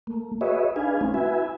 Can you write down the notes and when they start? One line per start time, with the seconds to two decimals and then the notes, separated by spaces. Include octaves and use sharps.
0.07 A3 A#3
0.41 F#4 G#4 B4 C#5 D#5 E5
0.76 D4 D#4 G#4 B4 F5 G#5
1.01 A3 C4 C#4
1.14 E4 F#4 B4 E5 G#5